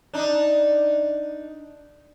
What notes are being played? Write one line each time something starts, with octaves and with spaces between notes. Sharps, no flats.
D4 D#4